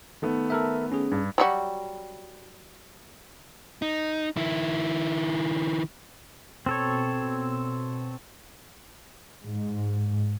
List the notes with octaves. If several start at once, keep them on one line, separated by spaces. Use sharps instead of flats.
D#3 A3 B3
A4 A#4 E5
C#4 G#4
G2
F#3 G3 F#4
D#4
D#3 E4
B2 C4 A4 C#5
G#2